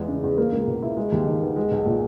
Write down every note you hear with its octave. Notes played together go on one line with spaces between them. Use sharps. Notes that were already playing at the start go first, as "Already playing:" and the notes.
Already playing: E2 G#3
C#3
E2
A#3
C#2
B2
E4
G#3
D#2
D#3
B3
G#3
B1
A#2